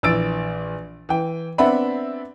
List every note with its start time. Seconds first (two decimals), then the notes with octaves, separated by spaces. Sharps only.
0.03 A#1 E3 E6 A6 D7
1.09 E3 G5
1.58 B3 C4 D4 E5 F#5 B5